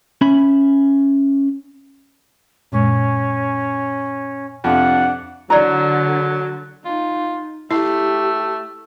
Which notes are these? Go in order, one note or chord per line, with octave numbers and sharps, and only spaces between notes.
C#4 E5 B5
F#2 A#2 G#3 C#4
F2 C3 D4 F#5
D3 F#3 E4 D5 A#5
D#4 F4
A3 E4 G4 E6